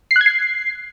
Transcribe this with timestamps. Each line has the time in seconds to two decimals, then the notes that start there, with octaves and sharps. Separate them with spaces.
0.11 C7
0.16 F#6
0.21 G#6
0.26 C7